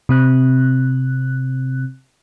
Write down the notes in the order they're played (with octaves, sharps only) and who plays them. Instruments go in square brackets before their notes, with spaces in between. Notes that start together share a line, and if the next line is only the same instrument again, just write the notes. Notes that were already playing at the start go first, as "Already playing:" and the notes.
[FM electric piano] C3 C4 F#6